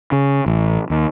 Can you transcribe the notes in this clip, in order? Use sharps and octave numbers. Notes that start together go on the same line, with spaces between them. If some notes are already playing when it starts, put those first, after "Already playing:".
C#3
A1
D#2